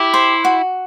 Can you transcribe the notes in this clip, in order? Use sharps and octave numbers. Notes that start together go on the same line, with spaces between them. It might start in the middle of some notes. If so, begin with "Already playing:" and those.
Already playing: E4 G4
C5
F#4